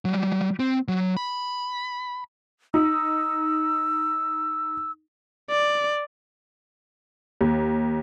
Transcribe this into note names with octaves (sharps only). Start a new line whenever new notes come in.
F#3 G3
C4
F#3
B5
D#4 E6
D5
D#2